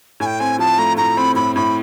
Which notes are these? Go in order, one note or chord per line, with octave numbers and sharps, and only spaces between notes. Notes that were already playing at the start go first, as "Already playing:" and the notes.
A2 G#5
G5
C4 G#5
F3 A5
A3 A#5
A2 A#5
C4 B5
A2 B5
A2 B5